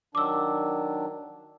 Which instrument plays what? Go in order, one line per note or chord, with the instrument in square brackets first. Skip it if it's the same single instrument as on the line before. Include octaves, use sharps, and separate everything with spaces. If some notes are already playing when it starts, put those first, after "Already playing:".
[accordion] D#3 F#3 D4 [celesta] D6 E6